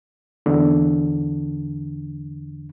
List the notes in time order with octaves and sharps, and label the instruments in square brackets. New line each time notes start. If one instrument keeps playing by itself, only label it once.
[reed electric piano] E2 D3